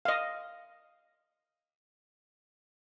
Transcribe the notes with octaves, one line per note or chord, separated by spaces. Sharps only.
D#5 F5